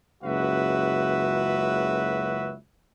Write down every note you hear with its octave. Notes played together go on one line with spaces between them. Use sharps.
F#1 C#2 F#4 B4 E5